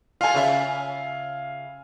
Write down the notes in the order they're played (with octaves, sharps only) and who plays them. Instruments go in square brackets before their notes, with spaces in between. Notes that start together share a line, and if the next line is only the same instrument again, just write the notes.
[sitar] F4 A4 [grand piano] F5 G#5
[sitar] C#3 F4 E5